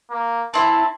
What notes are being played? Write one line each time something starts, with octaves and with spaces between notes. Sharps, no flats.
A#3
C4 E4 A5